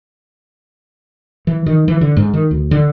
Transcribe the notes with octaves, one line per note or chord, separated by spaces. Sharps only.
E3
D#3
E3
D3
G#2
D#3
D2
D3